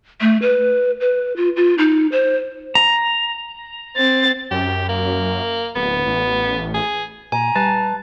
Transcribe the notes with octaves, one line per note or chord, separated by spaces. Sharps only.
A3
B4
B4
F4
F4
D#4
C5
A#5
C4 A6
F#2 G4
A#3
D1 B3
A1
G#4
A#2 G#5 A#5
G3 B4 A5